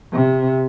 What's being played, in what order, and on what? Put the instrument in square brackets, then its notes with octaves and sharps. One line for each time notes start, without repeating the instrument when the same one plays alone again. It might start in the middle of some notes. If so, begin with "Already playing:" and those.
[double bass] C3